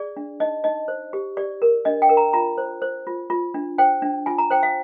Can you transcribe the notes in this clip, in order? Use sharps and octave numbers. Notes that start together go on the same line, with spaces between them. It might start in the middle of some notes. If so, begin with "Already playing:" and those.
Already playing: G#4 D5
D4
D#4 D#5
D#4 D#5
C5
G4
G4 D5
A#4
D4 D#5
G5
A#4
A#5
F4 A#5
C5
C5
F4
F4
D4
C5 G5
D4
F4 G#5
A#5
C5 G5
F5